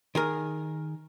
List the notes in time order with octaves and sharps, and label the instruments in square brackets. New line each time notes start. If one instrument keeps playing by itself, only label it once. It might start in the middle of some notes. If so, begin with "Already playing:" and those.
[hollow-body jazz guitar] D#3 G#4 A#4